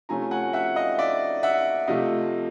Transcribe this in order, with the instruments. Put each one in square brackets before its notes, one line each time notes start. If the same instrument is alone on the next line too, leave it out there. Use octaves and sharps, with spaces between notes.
[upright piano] C3 F3 A3 C#4 G#5 A#5
F#5 G#5
E5 F#5
D#5 F5
D5 E5
E5 F#5
C3 F3 A3 D#5 F5